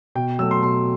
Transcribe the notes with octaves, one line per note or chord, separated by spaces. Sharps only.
B2 G5
F#3 A3 E6
C6
B2 C6